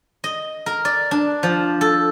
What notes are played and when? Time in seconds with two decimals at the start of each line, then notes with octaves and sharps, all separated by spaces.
0.24 D#5
0.66 A#4
0.85 D5
1.11 D4
1.43 F3
1.81 A4